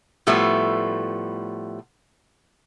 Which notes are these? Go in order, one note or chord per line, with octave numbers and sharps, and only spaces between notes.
A2 F3 G3 A3 B3